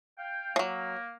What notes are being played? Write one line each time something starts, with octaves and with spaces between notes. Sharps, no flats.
F5 G5
F3 F#3 A#3